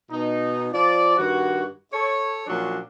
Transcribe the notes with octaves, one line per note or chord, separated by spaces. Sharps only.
B2 D#4
F3 F4 D5
G2 D#3 F#4
A4 C#5
A#2 F3 F#3 C#4 D4